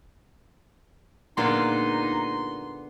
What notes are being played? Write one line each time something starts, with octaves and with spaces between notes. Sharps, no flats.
A#2 D3 G#3 A#3 B3 D#4 F4 C6